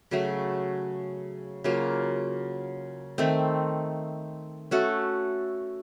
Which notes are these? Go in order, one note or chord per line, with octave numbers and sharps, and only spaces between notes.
C#3 F#3 A3
C#3 F#3 A#3 F4
D#3 A3 C4
A3 C#4 F#4 A4